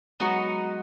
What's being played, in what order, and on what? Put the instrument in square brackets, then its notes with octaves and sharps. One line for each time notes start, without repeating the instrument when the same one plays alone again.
[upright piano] F#3 G#3 [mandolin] B3 D#4 F#4